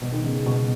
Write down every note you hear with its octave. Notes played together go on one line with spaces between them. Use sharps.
B2
D#3
C#3
B2